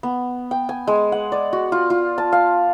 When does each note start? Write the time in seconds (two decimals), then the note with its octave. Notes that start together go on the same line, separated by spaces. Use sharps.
0.03 B3
0.51 G5
0.69 G#5
0.87 G#3
1.12 F#5
1.32 D5
1.53 F#4
1.72 F4
1.90 F4
2.18 A5
2.32 F5